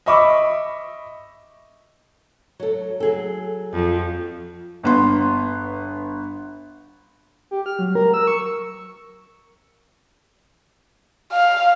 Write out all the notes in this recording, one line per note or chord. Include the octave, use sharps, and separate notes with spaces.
D#5 E5 B5 C#6 D6 E6
F#3 A4
F#3 G#4 A4
F2
G1 B3 C6
G4
F6
F#3
A#4
E6
C#6
F5